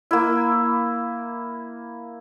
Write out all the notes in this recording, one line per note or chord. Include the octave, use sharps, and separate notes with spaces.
A#3 E4